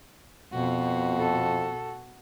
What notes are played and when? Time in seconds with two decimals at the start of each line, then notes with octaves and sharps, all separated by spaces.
0.53 F2 B2 F#4
1.19 A4